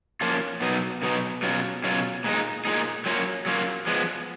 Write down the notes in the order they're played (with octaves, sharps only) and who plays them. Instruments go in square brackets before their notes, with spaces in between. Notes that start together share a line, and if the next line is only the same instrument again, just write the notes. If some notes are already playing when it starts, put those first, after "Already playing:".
[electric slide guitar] F3 A#3 C#4 F4
B2 F#3 B3 D#4
B2 F#3 B3 D#4
B2 F#3 C#4 F4
B2 F#3 C#4 F4
A#2 G#3 D#4
A#2 G#3 D#4
F#3 A#3 C#4 F4
F#3 A#3 C#4 F4
F3 G#3 B3